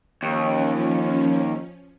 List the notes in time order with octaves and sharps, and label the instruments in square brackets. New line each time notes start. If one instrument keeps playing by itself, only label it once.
[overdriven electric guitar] D#2 [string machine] F3 C#4